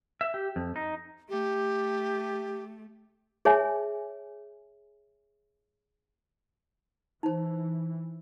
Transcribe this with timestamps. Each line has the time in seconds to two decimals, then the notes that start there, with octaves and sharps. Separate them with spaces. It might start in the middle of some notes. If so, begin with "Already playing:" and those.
0.21 E5
0.34 G4
0.56 F2
0.76 D#4
1.29 A3 G4
3.45 G#4 C#5 E5 G#5
7.23 E3 D#4 C5